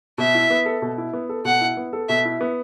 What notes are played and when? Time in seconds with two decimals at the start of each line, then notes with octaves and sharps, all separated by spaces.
0.18 B2 E5
0.35 E4
0.50 B3
0.66 A4
0.82 B2
0.98 E4
1.13 B3
1.29 A4
1.45 B2 F#5
1.61 E4
1.77 B3
1.93 A4
2.09 B2 E5
2.25 E4
2.41 B3